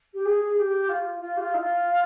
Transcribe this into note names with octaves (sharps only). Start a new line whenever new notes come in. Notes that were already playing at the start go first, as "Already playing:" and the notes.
G4
G#4
G4
F4
F4
G4
F4
D#4
F4